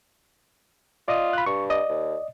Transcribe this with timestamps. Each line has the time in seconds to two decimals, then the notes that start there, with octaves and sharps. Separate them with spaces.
1.08 F4 D5 D#5 D#6
1.33 B5 F#6
1.46 G2 C#6
1.70 D5 D#5
1.89 D#2